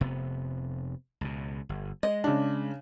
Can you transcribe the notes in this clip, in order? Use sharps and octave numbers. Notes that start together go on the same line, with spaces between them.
F1 C3 B3
C#2 B2
G1
G#3 D#5
C#3 D4